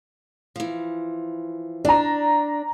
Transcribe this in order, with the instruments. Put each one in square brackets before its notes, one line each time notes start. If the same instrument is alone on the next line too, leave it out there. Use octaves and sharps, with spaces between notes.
[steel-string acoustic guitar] E3 F3
[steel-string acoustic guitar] D4 [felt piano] D5 A#5